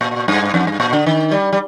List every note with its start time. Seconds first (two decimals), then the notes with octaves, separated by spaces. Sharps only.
0.01 A#2
0.28 G2
0.54 F2
0.67 G2
0.80 A#2
0.93 D3
1.06 D#3
1.31 G3
1.53 G3